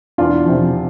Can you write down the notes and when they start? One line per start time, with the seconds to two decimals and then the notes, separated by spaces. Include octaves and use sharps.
0.18 E2 D4 F4
0.46 C3 F3